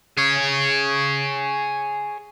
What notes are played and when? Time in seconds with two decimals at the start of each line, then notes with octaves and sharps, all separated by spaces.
0.17 G#4 C#5